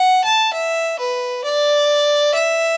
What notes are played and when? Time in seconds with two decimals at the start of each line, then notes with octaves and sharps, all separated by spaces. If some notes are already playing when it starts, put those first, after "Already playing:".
Already playing: F#5
0.24 A5
0.54 E5
0.99 B4
1.45 D5
2.34 E5